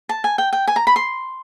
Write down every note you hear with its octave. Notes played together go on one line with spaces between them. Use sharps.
A5
G#5
G5
G5
G#5
A#5
B5
C6